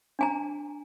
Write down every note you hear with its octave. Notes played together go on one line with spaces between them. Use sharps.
D4 G#5 A#5